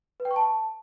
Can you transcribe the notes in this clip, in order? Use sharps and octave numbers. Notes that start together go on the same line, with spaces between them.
B4
G5
C#6
A5